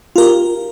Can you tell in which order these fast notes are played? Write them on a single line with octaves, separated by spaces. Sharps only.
F4 A#4 G4